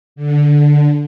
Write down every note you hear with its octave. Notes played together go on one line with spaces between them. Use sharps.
D3